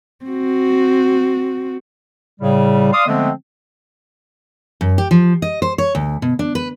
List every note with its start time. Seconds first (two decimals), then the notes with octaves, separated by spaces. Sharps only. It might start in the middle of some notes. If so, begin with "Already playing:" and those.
0.25 C4 F#4
2.40 A2 C#3 G3
2.92 D5 F5 C6 D#6
3.07 D3 F3 G#3 A3 B3 C4
4.81 F#2
4.98 G4
5.11 F3
5.42 D#5
5.62 C5
5.78 C#5
5.95 D2
6.22 B2
6.39 D4
6.55 B4